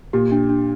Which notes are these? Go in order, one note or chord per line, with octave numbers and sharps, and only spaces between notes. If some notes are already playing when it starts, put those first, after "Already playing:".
A#2 G4
D4
D4